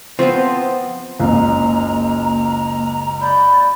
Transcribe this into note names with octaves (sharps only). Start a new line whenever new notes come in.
F3 B3 C4 C5
F#1 C#2 A#3 A#5
D5 B5 G6